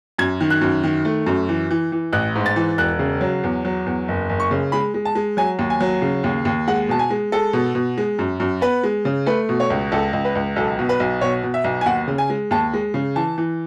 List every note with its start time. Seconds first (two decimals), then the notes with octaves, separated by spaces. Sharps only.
0.18 F#2 G#6
0.41 D#3
0.50 F#6
0.61 F#2
0.84 D#3
1.05 A3
1.26 F#2
1.49 E3
1.71 E3
1.92 E3
2.13 A1 F#6
2.35 G#2
2.46 A6
2.56 E3
2.78 E1 F#6
2.99 C#3
3.21 F#3
3.44 E2
3.65 F#3
3.86 E2
4.08 F#1
4.30 F#1
4.40 C#6
4.51 C#3
4.72 G#3 B5
4.94 G#3
5.05 A5
5.15 G#3
5.37 F#3 G#5
5.59 D#2
5.70 G#5
5.81 F#3
6.02 C#3
6.24 D#2
6.45 D#2
6.68 G#3 F#5
6.89 B2 A5
6.99 G#5
7.10 G#3
7.32 G#3 A4
7.53 B2
7.75 B2
7.98 G#3
8.19 F#2
8.40 F#2
8.61 B3 B4
8.83 G#3
9.05 C#3
9.26 A3 B4
9.49 B2
9.60 C#5
9.70 C#2
9.92 C#2 A4
10.13 C#2
10.25 B4
10.35 C#2
10.56 B1 A4
10.79 B2
10.89 B4
11.00 B1
11.21 B2 C#5
11.43 B2
11.54 E5
11.64 B1
11.81 G#5
11.86 D#2 F#5
12.08 C#3
12.18 G#5
12.30 G#3
12.51 D#2 A5
12.73 G#3
12.94 C#3
13.16 E3 A5
13.38 E3